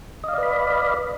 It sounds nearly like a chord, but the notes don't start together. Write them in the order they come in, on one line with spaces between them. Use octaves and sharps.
D#5 F5 D5 B4 B5